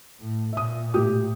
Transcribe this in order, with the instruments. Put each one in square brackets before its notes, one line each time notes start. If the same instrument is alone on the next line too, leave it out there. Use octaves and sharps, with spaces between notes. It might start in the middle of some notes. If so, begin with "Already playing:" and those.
[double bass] A2
[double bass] A#2 [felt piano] E5 D#6
[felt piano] A2 G4 D#6